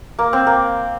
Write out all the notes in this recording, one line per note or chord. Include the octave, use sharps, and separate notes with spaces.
A#3
C4
A#3